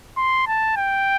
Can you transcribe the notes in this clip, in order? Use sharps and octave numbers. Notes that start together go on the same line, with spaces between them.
C6
A5
G5